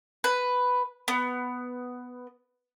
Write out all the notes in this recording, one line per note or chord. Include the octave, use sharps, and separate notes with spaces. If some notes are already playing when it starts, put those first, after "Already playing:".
B4
B3